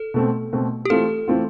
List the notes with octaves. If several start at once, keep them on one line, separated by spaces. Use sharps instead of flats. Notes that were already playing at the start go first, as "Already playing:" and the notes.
Already playing: A4
B2 A3 C4
B2 A3 C4
G4
E3 A3 C4 F4 A4
E3 A3 C4 F4